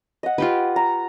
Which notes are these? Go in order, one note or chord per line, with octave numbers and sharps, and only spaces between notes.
D#5 F#5
F4 G4 B4
A#5